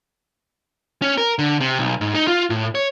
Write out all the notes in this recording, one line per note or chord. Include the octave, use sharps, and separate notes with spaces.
C#4
A#4
D3
C3
B1
G#2
D#4
F4
A2
C#5